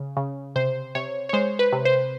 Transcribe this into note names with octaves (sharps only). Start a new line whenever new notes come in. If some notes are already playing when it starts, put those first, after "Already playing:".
Already playing: C#3
C#3
C3 C5
C3 C#5
C#5
G#3 C5
B4
C3
C5